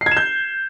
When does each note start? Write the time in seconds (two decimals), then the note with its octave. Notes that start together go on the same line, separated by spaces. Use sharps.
0.01 C7
0.06 G#6
0.11 E7
0.17 G6